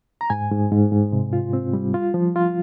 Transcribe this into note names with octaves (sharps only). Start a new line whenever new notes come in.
A#5
G#2 G#5
G#2
G#2
G#2
C3
F4
C4
G3
F4
F3
F4